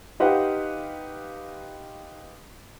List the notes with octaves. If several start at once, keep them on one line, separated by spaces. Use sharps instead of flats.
D#4 G4 B4 C5 F5 F#5